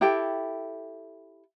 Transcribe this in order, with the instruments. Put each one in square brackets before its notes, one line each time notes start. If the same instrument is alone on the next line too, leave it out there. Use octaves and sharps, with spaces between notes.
[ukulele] E4 G4 A4 G5